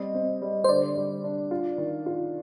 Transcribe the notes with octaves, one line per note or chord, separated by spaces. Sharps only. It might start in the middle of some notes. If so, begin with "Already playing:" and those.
Already playing: G3 C4 D#5
C4
G3
C5
D3 D5
G3
D4
F4
D#3
F4